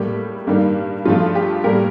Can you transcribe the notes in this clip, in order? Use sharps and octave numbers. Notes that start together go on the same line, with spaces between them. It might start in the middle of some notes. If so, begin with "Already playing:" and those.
Already playing: A2 G3 A#3 G4
G2 D#3 G3 A#3
G2 F3 A3 F4
G4
A2 G3 A#3 G4 A#4